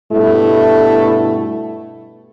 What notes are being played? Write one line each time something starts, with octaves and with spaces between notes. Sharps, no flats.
G2 B2 A3 E4